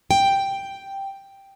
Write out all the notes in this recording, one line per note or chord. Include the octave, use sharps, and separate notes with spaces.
G5